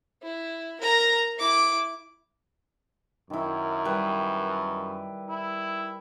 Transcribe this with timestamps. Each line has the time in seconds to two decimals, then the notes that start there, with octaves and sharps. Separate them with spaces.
0.22 E4
0.81 A#4 A#5
1.37 E4 D6
3.30 F#2 D#3 E4
3.85 G3 B4
5.29 E4